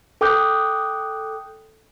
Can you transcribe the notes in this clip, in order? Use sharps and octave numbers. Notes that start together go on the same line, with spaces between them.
A4 G5 D6 D#6 F#6 G6